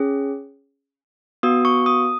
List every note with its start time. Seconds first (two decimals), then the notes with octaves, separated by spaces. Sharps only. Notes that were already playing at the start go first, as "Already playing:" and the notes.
Already playing: C#4 G#4
1.43 B3 F#4 D#6
1.65 C#6
1.86 D#6